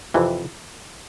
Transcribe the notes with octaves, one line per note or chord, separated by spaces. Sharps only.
F2 C3 E3